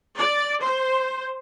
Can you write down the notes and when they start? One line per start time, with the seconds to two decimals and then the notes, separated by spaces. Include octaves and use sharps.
0.18 D5
0.63 C5